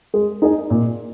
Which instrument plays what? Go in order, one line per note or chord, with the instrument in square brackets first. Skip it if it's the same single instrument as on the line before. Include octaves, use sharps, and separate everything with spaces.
[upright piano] G#3
D#4 G#4 D#5
A#2